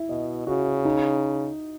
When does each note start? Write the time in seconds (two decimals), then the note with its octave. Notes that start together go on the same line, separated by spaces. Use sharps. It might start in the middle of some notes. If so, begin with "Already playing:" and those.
Already playing: E4 E5
0.09 B2 D#5
0.47 C#3 F#4
0.85 D#4